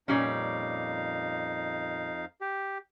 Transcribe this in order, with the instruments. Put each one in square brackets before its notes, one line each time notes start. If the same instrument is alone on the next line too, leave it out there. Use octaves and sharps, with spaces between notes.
[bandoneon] F2 D#4 F5 [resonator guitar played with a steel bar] A#2 G3 C#4
[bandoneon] G4